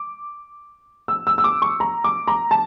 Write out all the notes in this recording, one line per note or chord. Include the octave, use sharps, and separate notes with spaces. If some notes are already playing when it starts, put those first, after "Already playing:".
Already playing: D6
E6
E6
E6
D6
C#6
A#5
D6
A#5
A5